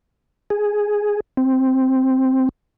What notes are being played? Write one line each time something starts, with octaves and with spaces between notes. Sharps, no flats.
G#4
C4